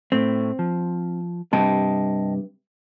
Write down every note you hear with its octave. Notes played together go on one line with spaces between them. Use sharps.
A2 A3 C4
F3
G2 C3 D#5 G5 A5